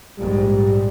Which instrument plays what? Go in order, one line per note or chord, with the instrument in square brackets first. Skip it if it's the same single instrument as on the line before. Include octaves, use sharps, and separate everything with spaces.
[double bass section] A#1 G#2 [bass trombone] G3